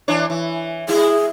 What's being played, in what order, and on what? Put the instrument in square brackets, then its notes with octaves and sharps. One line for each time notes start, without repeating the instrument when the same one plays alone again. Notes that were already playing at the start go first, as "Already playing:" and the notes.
[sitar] E3 D4 C#5
E3
[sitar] E4 [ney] G#4